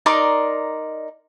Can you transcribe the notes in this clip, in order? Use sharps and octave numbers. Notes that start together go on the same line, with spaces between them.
D#4 A#4 D5 C6